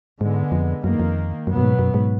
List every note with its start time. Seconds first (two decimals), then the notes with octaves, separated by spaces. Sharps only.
0.21 G#2 D3 G#3 B3
0.52 F2
0.84 F#2 D#3 A#3
1.00 F2
1.47 F#2 B2 F#3 B3
1.57 F#2
1.63 G#2
1.79 F#2
1.94 G#2